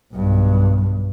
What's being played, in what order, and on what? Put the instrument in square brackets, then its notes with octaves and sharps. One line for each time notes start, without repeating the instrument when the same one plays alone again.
[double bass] B1 G2